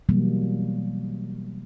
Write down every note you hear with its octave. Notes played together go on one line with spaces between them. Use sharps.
B2 E3 F#3 G3 A#3